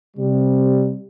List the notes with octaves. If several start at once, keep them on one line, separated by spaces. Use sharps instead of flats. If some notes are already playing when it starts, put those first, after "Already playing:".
C3 G3